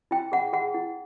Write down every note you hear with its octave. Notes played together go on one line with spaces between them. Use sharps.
E4 G5
G#4 F#5
G#4 F#5
E4